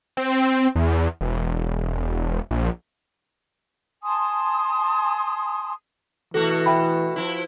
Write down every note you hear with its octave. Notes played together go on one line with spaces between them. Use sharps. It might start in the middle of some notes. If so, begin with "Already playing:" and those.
C4
E2
E1
A#1
G#5 A5 C6 D#6
B2 E3 A3 F#4 A4
E5 G5 B5
F3 E4